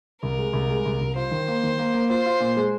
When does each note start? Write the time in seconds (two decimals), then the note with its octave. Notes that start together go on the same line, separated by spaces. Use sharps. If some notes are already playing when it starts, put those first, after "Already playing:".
0.23 C2 A#4
0.39 G#3
0.53 C2
0.69 G#3
0.86 C2
1.01 C2
1.16 F4 C5
1.31 D#3
1.48 A#3
1.63 D#3
1.79 A#3
1.94 A#3
2.10 F4 C5
2.26 F4
2.40 A#2
2.57 G#3